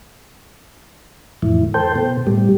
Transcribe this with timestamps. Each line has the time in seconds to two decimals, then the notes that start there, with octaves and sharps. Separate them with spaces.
1.42 F2 A2 E3
1.74 A4 C5 G5
1.95 B2
2.27 A2 G3